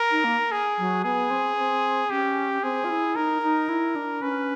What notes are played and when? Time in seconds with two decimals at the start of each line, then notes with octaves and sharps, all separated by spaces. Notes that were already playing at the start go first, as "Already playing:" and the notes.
Already playing: A#4
0.11 D#4
0.24 A#3
0.52 G#4
0.78 F#3
1.04 B3 G#4
1.31 C4
1.57 C4
2.10 C#4 G4
2.63 C4 G#4
2.84 F4
2.90 E4
3.16 D#4 A#4
3.42 D#4
3.69 E4
3.96 D4
4.22 C#4 B4